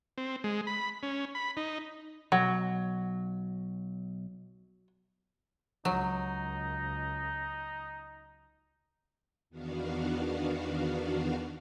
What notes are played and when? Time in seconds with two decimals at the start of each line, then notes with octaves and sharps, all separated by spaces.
0.18 C4
0.44 G#3
0.67 B5
1.03 C#4
1.35 B5
1.57 D#4
2.32 B1 F#3
5.85 C#2 F#3 D#4
9.49 E2 D#3 B3 D4 F#4 F5